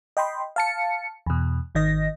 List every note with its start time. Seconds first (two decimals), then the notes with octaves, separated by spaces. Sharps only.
0.17 D#5 G5 B5 C6
0.56 F5 A5 C#7
1.26 E2 B2
1.75 G#1 D#3 D#5 A#6